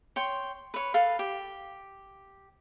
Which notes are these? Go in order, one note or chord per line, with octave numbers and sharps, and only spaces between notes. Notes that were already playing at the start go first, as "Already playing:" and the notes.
C#5 G5 C6
B4 C#5
A4 B4 F5
G4